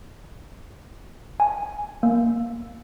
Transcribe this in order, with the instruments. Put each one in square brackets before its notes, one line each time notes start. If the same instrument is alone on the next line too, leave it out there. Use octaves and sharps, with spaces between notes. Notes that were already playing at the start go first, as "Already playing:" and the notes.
[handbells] G#5
A#3